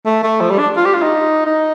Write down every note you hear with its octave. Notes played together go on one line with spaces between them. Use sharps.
A3
A3
F3
G3
D4
F4
G4
F4
D#4
D#4